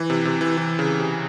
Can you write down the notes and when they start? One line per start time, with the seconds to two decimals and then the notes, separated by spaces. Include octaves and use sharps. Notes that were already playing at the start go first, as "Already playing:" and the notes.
Already playing: E3
0.10 C3
0.25 C3
0.41 E3
0.57 E3
0.79 C#3
1.00 C3